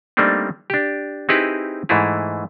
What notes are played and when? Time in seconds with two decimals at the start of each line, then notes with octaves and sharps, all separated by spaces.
0.17 G3 A3 A#3 C4 D4 D#4
0.70 D4 G4
1.29 C4 D#4 E4 G4 G#4 B4
1.89 G#2 E3 A3 E4 G#4